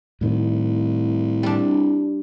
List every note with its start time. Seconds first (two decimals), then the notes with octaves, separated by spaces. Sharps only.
0.21 C2 A2 D#3
1.43 G3 D4